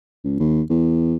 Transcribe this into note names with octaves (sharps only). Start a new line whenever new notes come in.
C#2
D#2
E2